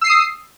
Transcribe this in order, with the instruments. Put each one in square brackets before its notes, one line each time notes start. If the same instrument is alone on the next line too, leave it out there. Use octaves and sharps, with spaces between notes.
[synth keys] E6
C7
D#7
D#6